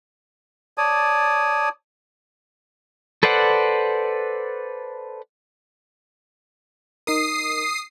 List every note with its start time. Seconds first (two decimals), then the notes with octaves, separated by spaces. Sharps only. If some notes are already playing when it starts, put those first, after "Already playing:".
0.78 C#5 D5 A5 D#6
3.23 A4 B4 C5 D5 F#5
7.07 D#4 A#4 D#6 C7